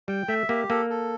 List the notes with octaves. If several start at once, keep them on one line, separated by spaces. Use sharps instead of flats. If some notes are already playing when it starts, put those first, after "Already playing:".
G3 G5
A3 E5
A#3 G4
A#3 A4
A4